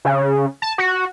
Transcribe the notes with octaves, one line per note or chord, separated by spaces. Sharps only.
C#3
A5
F#4